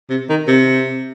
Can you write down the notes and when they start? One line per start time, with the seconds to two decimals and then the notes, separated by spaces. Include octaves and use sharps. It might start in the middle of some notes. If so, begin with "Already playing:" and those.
0.10 C3
0.29 D#3
0.48 C3